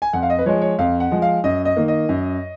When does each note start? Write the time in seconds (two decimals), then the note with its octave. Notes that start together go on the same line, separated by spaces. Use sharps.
0.02 G#5
0.13 F2 F#5
0.23 F5
0.30 D#5
0.39 B4
0.46 F3 G#3 C#5
0.62 C#5
0.79 F2 F5
1.00 F#5
1.11 F3 G#3
1.22 F5
1.44 F#2 D#5
1.65 D#5
1.77 D#3 A#3
1.88 D#5
2.09 F#2